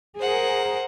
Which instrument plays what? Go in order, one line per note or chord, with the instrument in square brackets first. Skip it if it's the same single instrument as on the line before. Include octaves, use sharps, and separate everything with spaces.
[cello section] G#4 A#4 [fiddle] C5 F#5